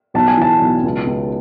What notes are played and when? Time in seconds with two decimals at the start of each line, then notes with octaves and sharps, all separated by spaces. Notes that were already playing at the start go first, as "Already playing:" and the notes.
0.14 B1 A5
0.28 G#5
0.37 E3 A5
0.61 B1
0.84 C#2
1.07 C#2